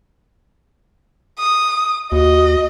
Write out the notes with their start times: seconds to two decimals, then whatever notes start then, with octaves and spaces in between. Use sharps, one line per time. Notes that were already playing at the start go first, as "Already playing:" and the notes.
1.39 D#6
2.12 D#2 F#4 D#5